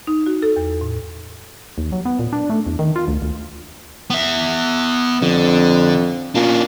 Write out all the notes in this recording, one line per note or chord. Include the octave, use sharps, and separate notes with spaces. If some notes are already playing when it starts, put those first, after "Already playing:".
D#4
F#4
A4
E2
A2
D#2
F#3
B3
A#2
D4
A3
E2
D#3
F4
D2
D2
B3 E5
F2 D3
A#2 C#4 D4